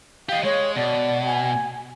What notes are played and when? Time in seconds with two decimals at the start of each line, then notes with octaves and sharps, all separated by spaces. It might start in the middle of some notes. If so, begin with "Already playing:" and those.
0.29 G4 D#5 F5
0.44 G#3 C#5
0.76 B2 D5
1.26 G#5